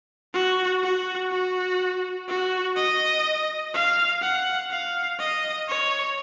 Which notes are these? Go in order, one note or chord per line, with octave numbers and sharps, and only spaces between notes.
F#4
F#4
F#4
F#4
D#5
F5
F#5
F5
D#5
C#5